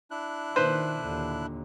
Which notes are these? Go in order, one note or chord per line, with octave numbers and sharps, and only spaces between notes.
D4 E4 F#6
A#2 D#3 B4 C5
D#2 A#2 D3